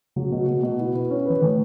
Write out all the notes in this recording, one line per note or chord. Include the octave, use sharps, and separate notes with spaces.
C#3 F#3
B2
B3
B2
E4
B4
C#4
E3 B4
A2 D3